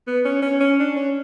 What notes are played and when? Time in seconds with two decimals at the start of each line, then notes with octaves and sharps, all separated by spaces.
0.07 B3
0.25 C#4
0.42 C#4
0.60 C#4
0.79 D4
0.96 C#4